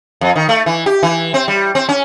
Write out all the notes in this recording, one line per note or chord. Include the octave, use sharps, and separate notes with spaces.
F2
D#3
A3
E3
G4
E3
C4
G3
C4
C#4